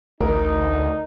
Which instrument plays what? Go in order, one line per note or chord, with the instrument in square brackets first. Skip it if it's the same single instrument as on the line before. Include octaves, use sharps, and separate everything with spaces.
[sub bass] A1 [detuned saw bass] D2 [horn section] D#4 [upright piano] A#4